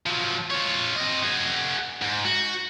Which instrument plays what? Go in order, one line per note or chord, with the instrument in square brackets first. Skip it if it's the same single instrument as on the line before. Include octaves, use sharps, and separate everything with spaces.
[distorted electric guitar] F3 F#3
F4 C#5
C4 D#5
F#4 G#4
G#2
F#4